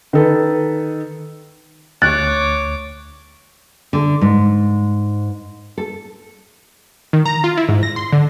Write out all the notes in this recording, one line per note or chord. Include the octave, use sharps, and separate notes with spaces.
D#3 A4 B4
D2 C#5 D6 F#6 A6
D3
G#2
A4
D#3
A#5
F4
E4
G#2
A#6
C6
D3